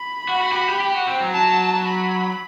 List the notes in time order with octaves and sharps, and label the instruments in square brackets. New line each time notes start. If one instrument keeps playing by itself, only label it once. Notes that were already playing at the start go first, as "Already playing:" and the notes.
Already playing: [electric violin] B5
[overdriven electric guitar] F#4
F#4
G4
F#4
G4
G4
F#4
C4
F#3
[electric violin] A5
B5